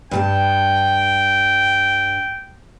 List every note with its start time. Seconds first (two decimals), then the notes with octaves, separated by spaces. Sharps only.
0.11 G2 A4 G5 A5